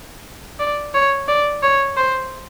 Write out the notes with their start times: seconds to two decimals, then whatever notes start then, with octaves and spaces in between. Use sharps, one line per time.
0.60 D5
0.94 C#5
1.28 D5
1.63 C#5
1.97 C5